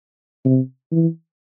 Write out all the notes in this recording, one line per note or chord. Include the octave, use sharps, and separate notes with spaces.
C3
E3